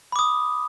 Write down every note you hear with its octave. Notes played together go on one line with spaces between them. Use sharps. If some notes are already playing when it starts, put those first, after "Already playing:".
B5 D6 D#6